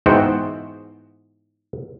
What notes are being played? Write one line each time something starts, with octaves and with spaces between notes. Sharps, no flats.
G#2 E3 B3 F#4 C5 G5